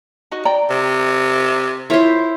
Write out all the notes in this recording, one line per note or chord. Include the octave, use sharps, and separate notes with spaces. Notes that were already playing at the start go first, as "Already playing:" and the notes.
D#4 F#4 D#5
D5 G5 A#5
C3
E4 F4 A#4 C5 C#5